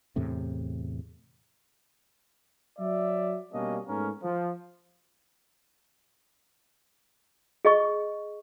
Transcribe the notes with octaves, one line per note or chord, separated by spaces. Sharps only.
E2 A2 C3
F#3 D5 E5
B2 G3 A#3 C#4 D4 D#5
G#2 A3 B3 C#4 A#4
F3
G#4 D#5 C#6